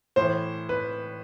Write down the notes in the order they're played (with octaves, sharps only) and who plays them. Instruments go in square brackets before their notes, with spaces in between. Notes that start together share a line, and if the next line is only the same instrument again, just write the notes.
[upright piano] A2 E3 C5
B4